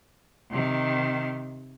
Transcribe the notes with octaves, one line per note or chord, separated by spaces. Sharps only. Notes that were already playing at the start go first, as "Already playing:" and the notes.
C3 D#3